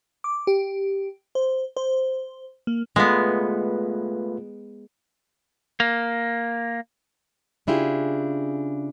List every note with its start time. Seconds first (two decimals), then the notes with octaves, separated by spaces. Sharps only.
0.24 D6
0.47 G4
1.35 C5
1.77 C5
2.67 A#3
2.96 G#3 A3 B3 F4 B4
5.80 A#3
7.67 C#3 D4 E4 F4 G4 G#4